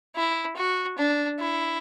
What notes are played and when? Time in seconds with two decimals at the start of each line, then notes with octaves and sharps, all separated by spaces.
0.16 E4
0.57 F#4
0.98 D4
1.39 E4